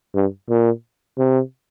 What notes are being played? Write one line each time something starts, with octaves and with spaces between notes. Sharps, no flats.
G2
A#2
C3